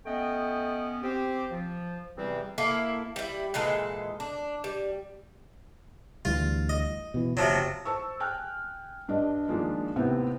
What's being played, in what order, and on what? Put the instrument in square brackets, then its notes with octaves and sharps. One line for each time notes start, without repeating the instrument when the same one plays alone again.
[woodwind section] A3 B3 C#4 D#5 F#5 G5
C4 G4
F3
E2 C3 E3 G3 C4
[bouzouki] A#3 E4 A4
G3 E4
A#2 E3 G#3 A4
D4
G3
[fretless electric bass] D2 E3 G3 [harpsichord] F4
[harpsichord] D#5
[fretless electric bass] B2 E3
[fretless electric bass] F#1 [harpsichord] C3 F3 F#3
[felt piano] C5 A5 C#6 E6
G5 G#5 F6 F#6
G2 D4 D#5
D#3 F3 G#3 A#3 D4 F4
D#2 A2 C3 B3 C4